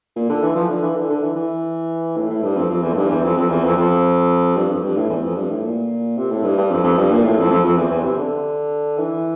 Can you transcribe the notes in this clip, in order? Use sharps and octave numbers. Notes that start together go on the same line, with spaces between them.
A#2
D3
E3
F3
D3
E3
D3
D3
E3
E3
A2
A2
G2
F2
F2
E2
A2
G2
E2
F2
F2
E2
F2
F2
G2
F2
G2
A2
E2
F2
G2
A2
A#2
C3
A2
G2
G2
F2
F2
G2
A#2
A2
F2
F2
F2
E2
E2
C3
D3
E3